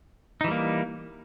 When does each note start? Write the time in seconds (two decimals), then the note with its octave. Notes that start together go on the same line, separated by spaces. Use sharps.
0.41 D#4
0.44 E3
0.48 G3
0.51 A#3